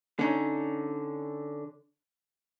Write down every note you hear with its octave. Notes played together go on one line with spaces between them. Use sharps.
D3 C#4 D#4